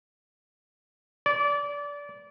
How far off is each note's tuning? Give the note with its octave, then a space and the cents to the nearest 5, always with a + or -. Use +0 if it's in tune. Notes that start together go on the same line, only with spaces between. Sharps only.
D5 -25